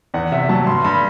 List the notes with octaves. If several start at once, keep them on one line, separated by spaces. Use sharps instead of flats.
E2 F#5
C3 E5
F#3 A5
G2 C6
G2 B5